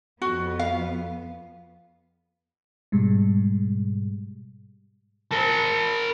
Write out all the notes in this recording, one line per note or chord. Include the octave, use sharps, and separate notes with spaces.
F2 B3 F#4
F5
G#2 B2 G3 G#3
A#4 A5